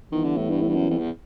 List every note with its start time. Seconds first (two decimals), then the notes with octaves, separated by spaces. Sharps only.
0.12 D#3 E3 G3 B3 E4
0.24 D3
0.37 A2
0.49 G2
0.62 A2
0.68 G2
0.74 F#2
0.90 F2
0.99 E2